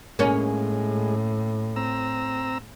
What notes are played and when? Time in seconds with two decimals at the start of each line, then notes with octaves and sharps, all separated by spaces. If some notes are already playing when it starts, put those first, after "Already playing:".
0.19 A2 G#3 A#3 C#4
1.76 C4 A#5 E6